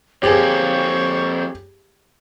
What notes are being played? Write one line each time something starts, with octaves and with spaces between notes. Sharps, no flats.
F2 A#3 G4 G#4 C5 C#5